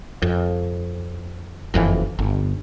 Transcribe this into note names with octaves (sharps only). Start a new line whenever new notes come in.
F2
F#1 F2 C#3 E3
G1